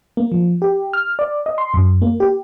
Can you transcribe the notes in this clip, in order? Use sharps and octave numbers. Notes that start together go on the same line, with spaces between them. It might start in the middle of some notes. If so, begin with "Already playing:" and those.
A#3
F3
G4
F6
D5
D#5
C6
F#2
A#3
G4